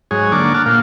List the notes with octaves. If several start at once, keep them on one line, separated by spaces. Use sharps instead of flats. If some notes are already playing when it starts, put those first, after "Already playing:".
G#2 F#3 G#4 C#5
D3 A#3 D4 C#6 D6
F#5 A5 D6 F6
A#2 A#3 F5